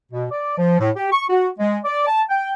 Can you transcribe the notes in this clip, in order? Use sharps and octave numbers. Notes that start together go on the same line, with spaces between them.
B2
D5
F3
A2
G4
C#6
F#4
G#3
D5
A5
G5